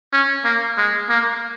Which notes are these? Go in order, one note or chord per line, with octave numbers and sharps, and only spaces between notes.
C#4
A#3
G#3
A#3